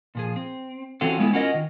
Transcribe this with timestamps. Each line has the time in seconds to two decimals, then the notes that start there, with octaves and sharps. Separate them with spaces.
0.15 A#2 F3 G#4
0.36 C4
1.01 E3 C4 C#4 F4 F#4 A4
1.19 G#3 B3 D#4 E4
1.33 C#4 F4 F#4 A#4 D5 D#5
1.54 D#3